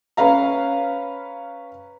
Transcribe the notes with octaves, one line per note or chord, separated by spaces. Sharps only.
C#4 B4 F5 A#5